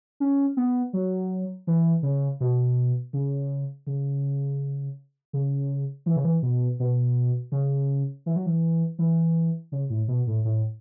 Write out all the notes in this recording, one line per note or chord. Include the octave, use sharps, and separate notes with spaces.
C#4
B3
F#3
E3
C#3
B2
C#3
C#3
C#3
E3
C#3
E3
B2
B2
C#3
E3
F#3
E3
E3
C#3
A2
B2
A2
A2